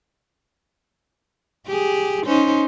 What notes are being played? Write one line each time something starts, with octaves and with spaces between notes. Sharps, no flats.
G4 G#4
C#4 D#4 C5